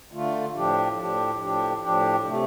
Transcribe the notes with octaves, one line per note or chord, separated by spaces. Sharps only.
D3 A3 F4
A2 F3 D4 G4
A2 F3 D4 G4
A2 F3 D4 G4
A2 F3 D4 G4
C3 A3